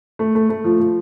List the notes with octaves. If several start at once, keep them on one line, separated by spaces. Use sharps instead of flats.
A3
A3
A3
F3
F3